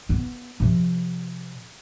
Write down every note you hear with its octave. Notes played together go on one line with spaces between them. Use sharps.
B3 C4
C3 F3